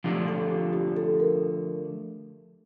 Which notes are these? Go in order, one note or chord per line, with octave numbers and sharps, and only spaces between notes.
D3 F3 A3 D4 F4 G4
A4
G4
G4
A4
A#4